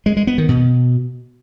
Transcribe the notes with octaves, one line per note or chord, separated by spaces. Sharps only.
G#3
G#3
B3
D#3
B2